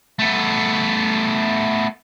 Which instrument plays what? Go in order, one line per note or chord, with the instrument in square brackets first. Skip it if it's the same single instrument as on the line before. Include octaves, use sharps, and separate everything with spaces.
[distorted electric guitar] A3 B3